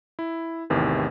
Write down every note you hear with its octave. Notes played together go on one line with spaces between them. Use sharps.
E4
A1 E2 C3 D#3 E3